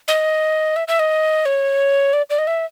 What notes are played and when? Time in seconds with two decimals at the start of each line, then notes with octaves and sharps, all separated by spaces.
0.08 D#5
0.76 E5
0.88 E5
0.99 D#5
1.46 C#5
2.13 D5
2.30 D5
2.39 D#5
2.47 E5